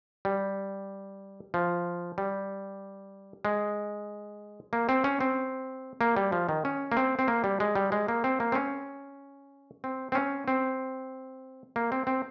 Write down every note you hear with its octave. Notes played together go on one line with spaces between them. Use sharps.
G3
F3
G3
G#3
A#3
C4
C#4
C4
A#3
G3
F3
D#3
C#4
A#3
C4
C4
A#3
G3
G#3
G3
G#3
A#3
C4
A#3
C4
C#4
C4
C4
C#4
C4
A#3
C4
C4